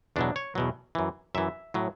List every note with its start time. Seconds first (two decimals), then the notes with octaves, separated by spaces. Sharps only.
0.16 E2 B2 F#3 D4
0.36 C#5
0.55 E2 B2 F#3
0.95 F#2 E3
1.35 F#2 E3 E5
1.74 A2 F#3